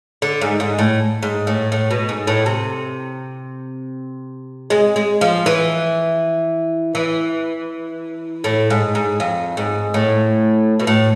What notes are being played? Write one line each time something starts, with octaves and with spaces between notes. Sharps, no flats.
D3
G#2
G#2
A2
G#2
A2
A2
B2
G#2
A2
C3
G#3
G#3
F3
E3
E3
A2
G#2
G#2
F2
G#2
A2
B2
A2